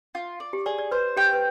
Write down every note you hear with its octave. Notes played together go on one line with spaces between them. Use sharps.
F4
D5
G4
G#4 D5
D5
B4 C5
G4 G5
B4